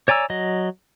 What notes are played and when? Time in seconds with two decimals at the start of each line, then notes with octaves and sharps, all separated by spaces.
0.08 C#5 D5 G#5 A#5 E6
0.30 F#3 D#5